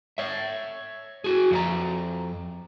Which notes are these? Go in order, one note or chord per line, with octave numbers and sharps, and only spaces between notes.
C#5 E5
F#4 G#4
F2 F4 A#5